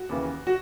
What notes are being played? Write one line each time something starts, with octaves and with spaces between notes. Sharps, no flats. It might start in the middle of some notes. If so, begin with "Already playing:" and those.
Already playing: F#4
D#2 C#3 E3
F#4